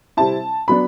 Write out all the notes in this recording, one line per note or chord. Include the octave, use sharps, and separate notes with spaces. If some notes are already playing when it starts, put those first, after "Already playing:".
C3 G3 C4 E4 A5
F#3 B3 D4 B5